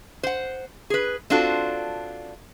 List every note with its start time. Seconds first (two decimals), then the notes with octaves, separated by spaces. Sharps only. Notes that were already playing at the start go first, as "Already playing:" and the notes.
0.23 C5 F#5
0.90 G#4 B4
1.30 C4 D4 F4 F#4 A4